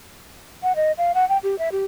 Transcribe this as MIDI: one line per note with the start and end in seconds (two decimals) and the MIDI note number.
0.63 0.75 78
0.76 0.92 75
0.98 1.12 77
1.14 1.27 78
1.29 1.38 79
1.43 1.58 67
1.59 1.69 76
1.72 1.85 67